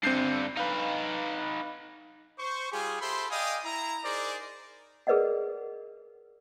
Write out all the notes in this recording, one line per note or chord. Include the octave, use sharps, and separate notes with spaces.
G2 D3 C4 G6 C7
D#4 B4 F5
C5 C#6
G3 F4 G4 G#4
G4 A4 C5 E5 B5 C6
D5 D#5 F5 G5 G#5 D#6
E4 A#5
D#4 G#4 A#4 C5 D5
G#4 A#4 B4 D5 D#5 F#5